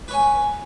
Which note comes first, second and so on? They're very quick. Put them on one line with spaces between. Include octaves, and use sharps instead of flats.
B4 C#5 G#5